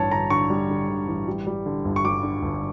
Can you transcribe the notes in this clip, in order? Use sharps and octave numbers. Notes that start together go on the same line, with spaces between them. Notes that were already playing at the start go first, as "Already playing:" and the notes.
Already playing: A1 G2 C#5 A5
D3 A#5
D3 C#6
G3
D3
D3
A1
G3
G3
D3
G1
C#6
G3 D6
D3
G1